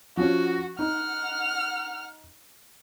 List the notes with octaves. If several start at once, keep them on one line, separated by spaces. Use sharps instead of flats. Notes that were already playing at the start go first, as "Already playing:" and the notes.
F3 C#4 F#4
D#4 F#5 F6